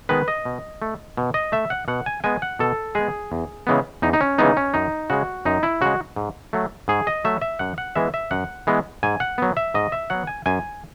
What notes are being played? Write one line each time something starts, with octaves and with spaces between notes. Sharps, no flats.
D#3 G#3 B3 B4
D#5
B2
A3
B2
D#5
A3 E5
F#5
B2 F#5
G#5
G#3 B3 G#5
F#5
B2 A4
G#3 B3 G#4
E2
C#3 E3 G#3 B3
E2 D#4
D#4
C#4
C#3 E3 G#3 B3 D#4
C#4
F#2 D#4
C#3 G#3 F#4
F#2 D#4
E4
C#3 G#3 F#4
G#2
F#3 A3
G#2 G#4
D#5
F#3 A3 E5
E5
F#2 F#5
F#5
E3 G#3 B3 E5
E5
F#2 F#5
E3 G#3 B3
G#2 G#5
F#5
F#3 B3
E5
G#2 D#5
E5
F#3 B3 F#5
G#5
F#2 G#5